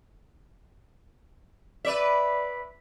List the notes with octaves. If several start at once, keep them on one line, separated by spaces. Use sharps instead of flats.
B4 D5 E5